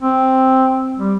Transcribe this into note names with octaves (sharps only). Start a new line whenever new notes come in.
C4
G3